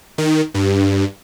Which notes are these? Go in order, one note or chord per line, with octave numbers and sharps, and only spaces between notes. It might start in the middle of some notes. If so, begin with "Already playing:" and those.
D#3
G2